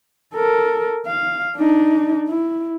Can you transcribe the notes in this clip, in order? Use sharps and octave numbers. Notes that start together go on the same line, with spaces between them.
A4 A#4
F5
D4 D#4
E4